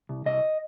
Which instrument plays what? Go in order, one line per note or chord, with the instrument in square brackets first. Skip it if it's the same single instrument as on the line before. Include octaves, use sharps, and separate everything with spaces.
[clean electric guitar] C2
C2 D#5